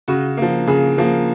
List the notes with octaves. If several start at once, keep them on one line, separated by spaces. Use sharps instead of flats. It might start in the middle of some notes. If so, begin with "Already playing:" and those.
C#3 F#4
F3 A#3
C#3 G#4
F3 A#3